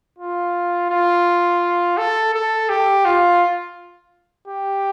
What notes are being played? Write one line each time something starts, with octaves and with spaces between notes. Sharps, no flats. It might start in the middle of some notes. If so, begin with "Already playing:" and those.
F4
F4
A4
A4
G4
F4
G4